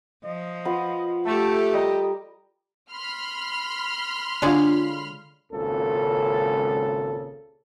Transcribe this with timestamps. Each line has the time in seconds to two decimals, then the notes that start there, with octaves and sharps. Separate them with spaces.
0.25 F3 D#5
0.65 F4 B4 F#5
1.26 A3 G4 A4 A5
1.74 G3 A#4 D#5
2.92 B5 C6 F6
4.42 D3 F#3 G#3 D4 F4
5.52 G#1 C#2 A#2 C#3 A4